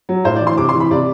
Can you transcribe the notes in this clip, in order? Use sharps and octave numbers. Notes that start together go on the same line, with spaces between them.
F#3
A2 C5
D5
E3
C6
C3 D6
C6
E3
B5
C3 D5